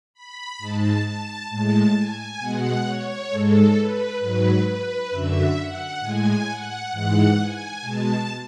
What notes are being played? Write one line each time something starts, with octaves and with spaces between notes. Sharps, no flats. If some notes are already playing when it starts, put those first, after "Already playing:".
B5
G#2 G#3 A5
A5
A2 G#3 A5
G#5
B2 G#3 F#5
C#5
G#2 G#3 A4
B4
G#2 F#3 B4
B4
F#2 D3 F#3 E5
F#5
A2 G#3 G#5
F#5
G#2 E3 G#3 F#5
G#5
B2 G#3 A5